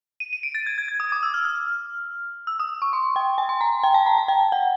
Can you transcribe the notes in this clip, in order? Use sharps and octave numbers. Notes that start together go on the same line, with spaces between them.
D#7
D#7
D7
A6
G#6
G#6
G#6
D#6
D6
E6
F6
F6
E6
D#6
C#6
C6
G5
G#5
C6
A#5
G5
A5
A#5
A5
G5
F#5